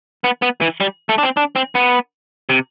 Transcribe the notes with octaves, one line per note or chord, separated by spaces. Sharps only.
B3
B3
E3
G3
A3
D4
C4
D4
C4
B3
C3